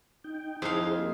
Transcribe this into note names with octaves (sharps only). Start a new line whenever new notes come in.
D#4 G5
F2 D#4 E4 G#4 C5 F5
A#3 G4